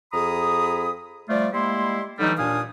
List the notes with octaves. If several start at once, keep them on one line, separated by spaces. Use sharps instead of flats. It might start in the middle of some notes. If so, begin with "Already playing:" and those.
F2 G#4 A#5 B5 D#6
F3 G3 A3 F4 D5
G3 G#3 A#3 E4 C6
D3 E3 F#3 G3 A3 D#4
D#2 A#2 D4 F5 G#5 D#6